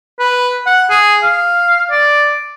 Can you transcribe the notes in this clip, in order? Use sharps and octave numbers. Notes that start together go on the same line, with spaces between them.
B4
F#5
G#4
F5
D5